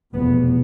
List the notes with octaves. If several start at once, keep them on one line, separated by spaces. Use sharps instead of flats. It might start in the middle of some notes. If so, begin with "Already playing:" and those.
F1 E2 B2 B3